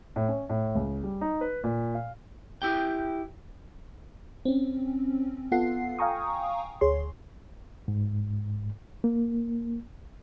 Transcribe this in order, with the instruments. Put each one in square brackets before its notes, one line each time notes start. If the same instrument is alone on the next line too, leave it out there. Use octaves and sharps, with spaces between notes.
[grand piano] A2
C#4
A2
C#2
G3
D#4
B4
A#2
F5
[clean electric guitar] E4 G4 G5
[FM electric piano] C4 C#4
B3 F4 A4 F#5 C7
F5 G5 G#5 A#5 C#6 D#6
D2 G#4 C#5 C6
[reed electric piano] G#2
A#3